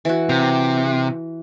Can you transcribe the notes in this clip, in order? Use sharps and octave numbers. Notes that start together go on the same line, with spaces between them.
E3 F#4
C3 A#5